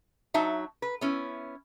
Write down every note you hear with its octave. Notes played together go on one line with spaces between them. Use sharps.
F#3 D#4 E5 A5
B4
B3 C#4 E4